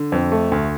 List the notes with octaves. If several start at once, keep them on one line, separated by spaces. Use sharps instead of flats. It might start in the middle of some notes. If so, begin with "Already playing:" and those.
Already playing: D3
F2
A3
D2